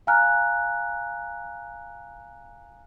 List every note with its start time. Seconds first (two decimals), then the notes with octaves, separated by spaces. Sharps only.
0.07 F5 G#5 A#5 F6 F#6